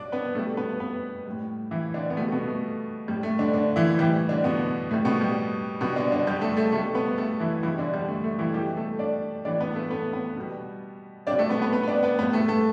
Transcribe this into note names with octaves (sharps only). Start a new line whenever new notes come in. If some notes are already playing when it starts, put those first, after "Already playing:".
Already playing: B2 G3 D4 D5
B3 B4
B2 G3 A3 A4
B3 B4
B3 B4
A2 G3
E3 E4
D3 D4
B3
B2 G3 A3
B2 B3
A3
A2 G3
A3
D3 D4
D3 D4
E3 E4
A2 E3 G3 G4
D3 D4
B2 B3
A2 G3 A3
B2 B3
G3
B2 G3 B3
D3 D4
D3 D4
G3 G4
A3 A4
A3 A4
B2 G3 A3 A4
B3 B4
A3 A4
E3 E4
B2 E3 G3 E4
D3 D4
G3
A3
A3
E3 E4
B2 G3 G4
A3 A4
D4 D5
A2 E3 G3 D4 D5
B3 B4
A3 A4
B3 B4
B3 B4
B2 G3
G3 D4 D5
B2
A3 A4
B3 B4
B3 B4
B3 B4
B4
D4 D5
B3 B4
A2 G3 B3 B4
A3 A4
A3 A4